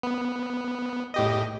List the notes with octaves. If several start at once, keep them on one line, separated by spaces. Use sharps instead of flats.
B3
A2 G4 D#5